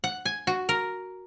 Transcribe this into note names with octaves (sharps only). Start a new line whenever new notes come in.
F#5
G#5
F#4
A#4